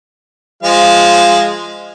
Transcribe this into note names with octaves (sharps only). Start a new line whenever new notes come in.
F3 G#3 F5